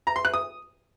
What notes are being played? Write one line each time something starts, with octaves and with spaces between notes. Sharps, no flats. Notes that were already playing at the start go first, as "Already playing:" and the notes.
A#5
C6
F#6
D#6